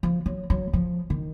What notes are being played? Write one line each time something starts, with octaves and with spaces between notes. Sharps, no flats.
F3
F#3
F#3
F3
D#3